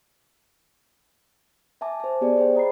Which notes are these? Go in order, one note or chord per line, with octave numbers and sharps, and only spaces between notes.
E5 G#5 A5 D6
C5 A5
B3 G4 G#4 D5 D#5
G#4 C5 G5
D#5 A#5 B5 C7